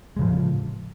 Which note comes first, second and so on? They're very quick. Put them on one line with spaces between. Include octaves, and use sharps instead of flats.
G#3 C#3 F3 A2